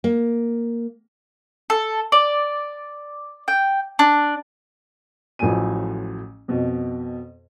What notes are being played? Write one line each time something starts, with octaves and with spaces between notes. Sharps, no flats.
A#3
A4
D5
G5
D4
A1 A2 F3 F#3 G#5 D#7
F2 B2